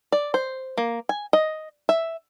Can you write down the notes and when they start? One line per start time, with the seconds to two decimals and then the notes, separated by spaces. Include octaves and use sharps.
0.12 D5
0.34 C5
0.78 A#3
1.09 G#5
1.33 D#5
1.89 E5